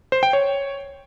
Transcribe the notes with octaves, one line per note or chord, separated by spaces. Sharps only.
C5
G5
C#5